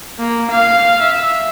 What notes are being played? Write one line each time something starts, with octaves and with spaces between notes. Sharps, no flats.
A#3
F5
E5